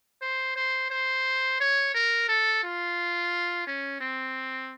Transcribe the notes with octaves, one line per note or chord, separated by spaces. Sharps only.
C5
C5
C5
C#5
A#4
A4
F4
C#4
C4